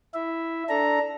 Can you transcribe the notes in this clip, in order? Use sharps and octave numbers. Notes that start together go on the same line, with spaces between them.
E4 E5
D4 A4 A#5